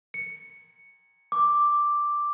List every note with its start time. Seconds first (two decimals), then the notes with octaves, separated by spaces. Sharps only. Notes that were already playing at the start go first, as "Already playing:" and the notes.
0.14 C#7
1.32 D6